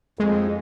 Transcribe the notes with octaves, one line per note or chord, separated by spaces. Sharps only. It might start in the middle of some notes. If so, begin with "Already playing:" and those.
F2 G#3